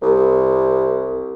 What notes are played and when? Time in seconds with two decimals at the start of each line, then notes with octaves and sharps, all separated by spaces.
0.02 C2